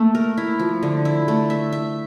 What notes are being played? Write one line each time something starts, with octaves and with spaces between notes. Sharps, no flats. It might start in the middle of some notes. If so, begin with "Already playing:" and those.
Already playing: A3 A#3
A#4
E4
F3
D3
E4
A3
E5
E5